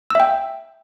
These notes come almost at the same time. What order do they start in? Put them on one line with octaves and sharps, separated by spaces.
E6 E5 G5